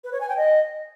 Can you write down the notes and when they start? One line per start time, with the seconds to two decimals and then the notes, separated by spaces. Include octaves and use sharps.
0.04 B4
0.12 C#5
0.21 G#5
0.29 G5
0.37 D#5